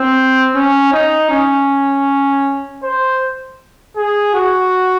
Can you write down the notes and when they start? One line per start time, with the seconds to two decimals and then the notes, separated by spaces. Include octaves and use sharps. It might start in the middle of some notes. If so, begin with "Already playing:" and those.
Already playing: C4
0.55 C#4
0.92 D#4
1.31 C#4
2.83 C5
3.96 G#4
4.34 F#4